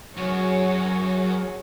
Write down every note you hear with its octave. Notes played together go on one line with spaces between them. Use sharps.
F#2 F#4 G#4 C#5